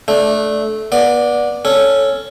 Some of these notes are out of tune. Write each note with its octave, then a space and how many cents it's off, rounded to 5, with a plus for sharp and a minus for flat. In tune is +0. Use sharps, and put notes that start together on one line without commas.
A3 -15 D4 -5
B3 -30 D5 +0
C#4 +0 A4 +0